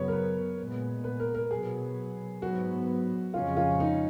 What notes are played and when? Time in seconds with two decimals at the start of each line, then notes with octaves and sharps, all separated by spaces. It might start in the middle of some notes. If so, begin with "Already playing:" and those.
Already playing: F#2 C#3 F#3 B3 C#5
0.08 A#4
0.12 B4
0.59 A#2 G#3 B3
1.04 B4
1.20 A#4
1.35 A#4
1.51 B2 F#3 B3 G#4
2.42 G#2 F#3 B3 F#4
3.34 F2 C#3 G#3 C#4 F4
3.57 F4
3.80 D#4